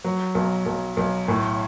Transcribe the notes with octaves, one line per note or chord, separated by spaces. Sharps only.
F#3
B1
B1
B1
A2